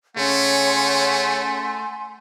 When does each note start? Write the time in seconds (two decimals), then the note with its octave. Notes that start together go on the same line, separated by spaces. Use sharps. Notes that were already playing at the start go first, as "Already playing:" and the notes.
0.17 C#3 A3 C#4 C#5 F#5 G#5 C6